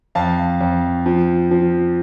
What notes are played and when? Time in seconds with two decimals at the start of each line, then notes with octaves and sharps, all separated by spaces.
0.15 F2 F5 A5
0.61 F2
1.06 F3
1.51 F3